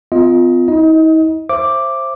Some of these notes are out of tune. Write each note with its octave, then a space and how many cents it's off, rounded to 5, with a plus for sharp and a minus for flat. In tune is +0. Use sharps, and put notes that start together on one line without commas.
C4 -45 F4 +0 D#5 +25
D#4 +45 D#5 +20
C5 +20 E5 +30 D6 +0